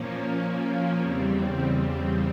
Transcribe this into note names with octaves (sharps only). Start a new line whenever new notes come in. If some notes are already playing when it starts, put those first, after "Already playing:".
Already playing: A#2 F3 A#3 C#4
E2 C#3 G3 C4